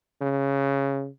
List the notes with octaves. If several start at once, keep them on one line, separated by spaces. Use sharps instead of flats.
C#3